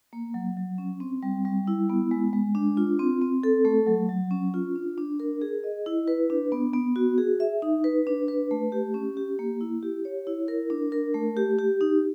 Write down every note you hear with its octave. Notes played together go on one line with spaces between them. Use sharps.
A#3
F#3
F#3
C#4
C4
G3
G3
E4
B3
G#3
G#3
D4
F4
C4
C4
A4
A3
F#3
F#3
C#4
F4
D4
D4
A#4
G#4
D#5
E4
B4
D4
B3
B3
F#4
G#4
E5
D#4
B4
D4
B4
A3
G4
C#4
G4
A#3
E4
G4
C#5
E4
A#4
D4
A#4
A3
G4
G4
D#4